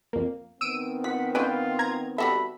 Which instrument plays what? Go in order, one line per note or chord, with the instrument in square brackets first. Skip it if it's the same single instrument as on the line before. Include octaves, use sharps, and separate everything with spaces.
[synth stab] F2 A#3
[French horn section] D#3 B3 C4 [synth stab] E6 D7 D#7
[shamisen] F4 [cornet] F#5 [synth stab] B6
[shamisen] C#4 G#5 [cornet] F4 [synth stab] B4 G5
[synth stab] A#5 G#6
[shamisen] G3 F#4 A4 [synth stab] E5 [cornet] B5